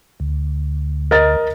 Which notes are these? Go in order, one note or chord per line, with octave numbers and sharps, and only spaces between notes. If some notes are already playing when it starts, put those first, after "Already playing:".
D2
A#4 D#5 A6